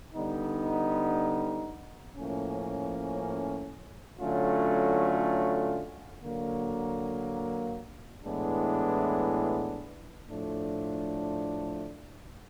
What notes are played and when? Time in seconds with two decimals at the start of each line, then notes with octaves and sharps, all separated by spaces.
0.14 D3 G3 B3 D#4
2.16 A2 F3 A#3 C#4
4.19 D3 F#3 A3 C#4 F4
6.22 D3 F#3 A#3
8.25 A2 E3 G#3 B3 D4
10.27 A2 F3 A3 D4